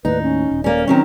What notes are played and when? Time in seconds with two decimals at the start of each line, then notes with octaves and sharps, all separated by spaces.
0.05 D#2 A2 D#4 B4
0.22 C#4
0.51 D#1
0.64 A#3 C#4 D5
0.88 D#3 F#3 C4 C#4